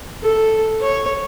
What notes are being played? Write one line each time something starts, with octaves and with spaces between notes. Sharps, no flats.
A4
C#5